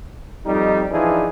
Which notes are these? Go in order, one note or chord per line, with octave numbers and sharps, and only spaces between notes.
F2 G3 D#4
E3 F3 D4 D#4 G#4